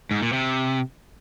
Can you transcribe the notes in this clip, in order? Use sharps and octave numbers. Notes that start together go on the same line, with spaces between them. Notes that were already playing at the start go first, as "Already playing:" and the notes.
G#2
A#2
C3